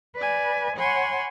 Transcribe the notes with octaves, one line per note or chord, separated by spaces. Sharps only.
B4 D5 G#5
C#5 F#5 G#5 B5 C6